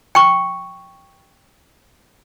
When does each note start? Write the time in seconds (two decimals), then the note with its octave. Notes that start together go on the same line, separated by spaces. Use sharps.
0.15 G5 C#6